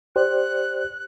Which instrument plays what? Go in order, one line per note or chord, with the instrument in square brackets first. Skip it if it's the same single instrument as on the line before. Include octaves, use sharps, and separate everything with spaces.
[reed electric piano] G4 C5 D5 [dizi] F#6